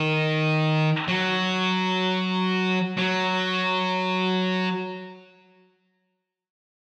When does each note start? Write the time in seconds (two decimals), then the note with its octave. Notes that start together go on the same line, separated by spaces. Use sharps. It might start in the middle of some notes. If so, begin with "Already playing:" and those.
Already playing: D#3
1.08 F#3
2.98 F#3